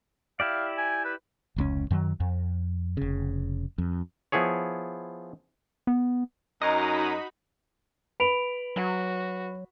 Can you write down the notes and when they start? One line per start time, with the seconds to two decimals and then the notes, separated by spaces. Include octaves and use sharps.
0.40 E4 G4 D5 F5
0.78 G#5
1.05 B4
1.56 F1 C#2 C#4
1.91 F#2 D#3 F#3
2.20 F2
2.97 F1 C#3
3.78 F2
4.32 F3 B3 E4 G#4 C#5
5.87 B3
6.62 F#2 D#4 F#4 D#5 A#5 B5
8.20 B4 B5 D7 F7
8.76 F#3 F#4